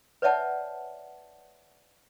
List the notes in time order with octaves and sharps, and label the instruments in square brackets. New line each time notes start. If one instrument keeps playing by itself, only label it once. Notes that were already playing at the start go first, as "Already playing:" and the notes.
[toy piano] B4 C#5 D5 E5 F#5 A5